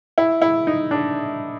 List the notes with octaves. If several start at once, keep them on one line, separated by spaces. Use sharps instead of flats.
E4
E4
D#4
D4